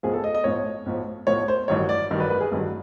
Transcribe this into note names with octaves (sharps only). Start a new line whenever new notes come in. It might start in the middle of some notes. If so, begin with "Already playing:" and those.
B1 A2 F3 G#4
A4
D#5
D#5
B1 A2 F3 C#5
B1 A2 F3
B1 A2 F3 C#5
C5
A1 G2 D#3 F#3 C#5
D5
A1 G2 D#3 F#3
B4
B4
G#4
A1 G2 D#3 F#3